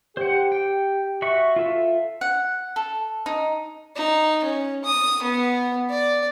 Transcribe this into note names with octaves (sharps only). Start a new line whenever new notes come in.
G4 C5 F#5
G5
F#4 E5 C#6
F4 A4 E5
F#5
A4
D#4
D#4
C#4
D#6
B3
D5